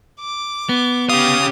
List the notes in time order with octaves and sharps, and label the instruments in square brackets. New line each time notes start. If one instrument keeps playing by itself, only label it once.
[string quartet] D6
[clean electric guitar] B3
[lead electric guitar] C#4 F5 [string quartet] G4 [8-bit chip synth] D#6